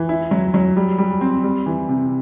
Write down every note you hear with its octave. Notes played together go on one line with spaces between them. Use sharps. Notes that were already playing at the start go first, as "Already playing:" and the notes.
Already playing: E3
E4
F#3
F#3
G3
G3
C4
G3
E3
C3